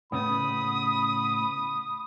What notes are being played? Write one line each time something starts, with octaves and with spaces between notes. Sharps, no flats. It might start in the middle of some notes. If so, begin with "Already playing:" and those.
A2 C#3 B3 B5 D#6